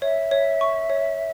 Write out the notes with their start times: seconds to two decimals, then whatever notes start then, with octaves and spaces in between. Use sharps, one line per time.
0.02 C#5 E5
0.31 C#5
0.61 C#6
0.90 C#5